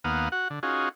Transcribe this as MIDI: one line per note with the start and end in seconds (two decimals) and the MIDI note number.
0.04 0.29 39
0.04 0.29 58
0.04 0.29 59
0.04 0.29 77
0.04 0.29 78
0.04 0.29 87
0.32 0.48 66
0.32 0.48 78
0.50 0.60 50
0.63 0.89 61
0.63 0.89 63
0.63 0.89 65
0.63 0.89 66
0.63 0.89 68